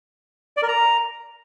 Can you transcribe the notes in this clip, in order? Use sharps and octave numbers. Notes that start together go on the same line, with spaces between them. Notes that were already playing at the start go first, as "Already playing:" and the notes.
D5
A#4
A#5